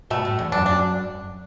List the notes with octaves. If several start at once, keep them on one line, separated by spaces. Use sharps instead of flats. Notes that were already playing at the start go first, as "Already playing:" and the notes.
B2 A3
A2
E2
F#2 D4
D4